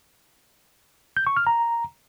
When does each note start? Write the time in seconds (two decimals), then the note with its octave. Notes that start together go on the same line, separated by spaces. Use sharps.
1.17 G6
1.27 C#6
1.37 F6
1.47 A#5